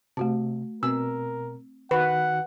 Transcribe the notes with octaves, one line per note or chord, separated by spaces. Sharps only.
C3 A3 F#4 A5
B2 C4 A#4 E6
D#3 F#4 B4 F#5